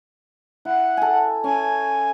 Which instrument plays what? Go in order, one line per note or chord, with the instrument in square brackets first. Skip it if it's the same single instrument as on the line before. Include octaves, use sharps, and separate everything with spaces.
[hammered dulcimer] E4 [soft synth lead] F#5
[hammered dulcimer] A4 G#5
[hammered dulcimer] C#4 [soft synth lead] G#5